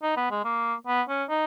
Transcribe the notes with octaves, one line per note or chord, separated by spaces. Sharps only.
D#4
B3
G#3
A#3
B3
C#4
D#4